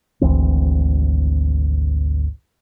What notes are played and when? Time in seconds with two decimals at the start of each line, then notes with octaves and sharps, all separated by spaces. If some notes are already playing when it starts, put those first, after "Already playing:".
0.21 G#1 D2 E3 C4